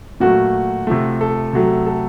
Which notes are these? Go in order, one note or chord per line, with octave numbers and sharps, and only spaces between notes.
A#2 F#3 A3 F#4
C3 F3 A3
A4
C3 F#3 A3
A4